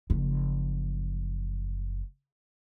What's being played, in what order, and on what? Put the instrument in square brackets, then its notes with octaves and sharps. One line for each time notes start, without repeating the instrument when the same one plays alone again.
[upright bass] F#1 F3